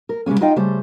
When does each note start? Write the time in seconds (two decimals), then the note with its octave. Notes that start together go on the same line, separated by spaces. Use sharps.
0.09 A#4
0.26 C#3 G3 G#3 A#3 C#4
0.41 D#4 F4 D#5 F5 G5
0.56 C#3 G3 A3 C5